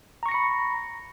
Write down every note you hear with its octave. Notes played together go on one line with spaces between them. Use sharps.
A#5 B5 C#6 A#6 C#7